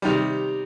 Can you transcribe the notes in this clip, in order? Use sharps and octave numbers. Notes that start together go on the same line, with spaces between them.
C3 D#3 G3